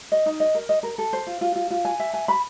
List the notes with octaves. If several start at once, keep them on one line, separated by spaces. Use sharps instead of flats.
D#5
D#4
D#5
A#4
D#5
A#4
A4
C5
F4
F4
F4
F4
G#5
E5
G#5
B5